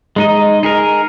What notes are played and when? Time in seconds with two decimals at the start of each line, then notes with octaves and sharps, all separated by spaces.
0.16 G#3 D#4 D#5
0.63 D#4 G#4 A#4